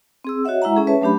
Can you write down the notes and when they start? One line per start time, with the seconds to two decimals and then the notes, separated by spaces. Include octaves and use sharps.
0.25 C4 G#4 E6
0.45 F#4 C#5 D#5 E5 F#5
0.62 G#3 E4 E5 F#5 A#5
0.75 C#4 G#4 A4
0.87 C#4 B4 C#5 E5 A5
1.01 F#3 A3 D4 G4 B5